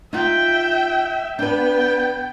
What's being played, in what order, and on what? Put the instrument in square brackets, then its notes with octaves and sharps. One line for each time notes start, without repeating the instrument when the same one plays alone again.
[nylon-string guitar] D#4 F4 [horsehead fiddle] E5 G5
[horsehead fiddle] B3 G5 [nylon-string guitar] D4 B4